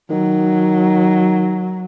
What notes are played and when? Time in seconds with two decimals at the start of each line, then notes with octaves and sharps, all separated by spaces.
0.10 D#3 F#3